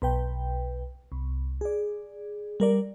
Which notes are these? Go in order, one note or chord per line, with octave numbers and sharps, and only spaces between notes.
B1 B4 G5
C2
G#4 D5
G3 A#4 D5